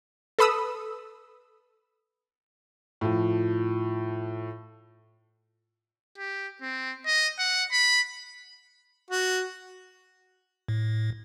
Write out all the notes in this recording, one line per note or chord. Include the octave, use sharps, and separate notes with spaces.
A4 B4 B5 D#6 E6
A2 F3
G4
C4
D#5
F#5
B5
F#4
A2